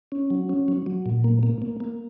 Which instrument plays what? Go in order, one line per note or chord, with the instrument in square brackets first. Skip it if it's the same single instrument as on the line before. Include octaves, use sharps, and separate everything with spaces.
[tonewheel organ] C#4
F#3
C#4
F#3
F#3
A#2
A#3
A#3
A#3
A#3